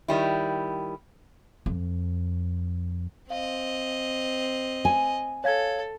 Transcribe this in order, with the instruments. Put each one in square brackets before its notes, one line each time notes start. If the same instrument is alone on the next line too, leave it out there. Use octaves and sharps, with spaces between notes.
[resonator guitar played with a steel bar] D#3 G3 E4
[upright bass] F2
[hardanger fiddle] C4 D#5 [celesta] F5
[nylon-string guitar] G#5
[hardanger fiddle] A4 [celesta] C#5 F5 G#6